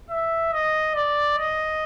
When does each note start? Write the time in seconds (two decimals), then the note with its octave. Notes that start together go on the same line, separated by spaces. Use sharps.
0.10 E5
0.53 D#5
0.95 D5
1.38 D#5